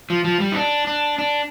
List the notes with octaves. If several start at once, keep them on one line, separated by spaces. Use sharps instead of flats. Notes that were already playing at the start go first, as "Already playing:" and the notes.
F3
F3
G3
D#4
D4
D4
D4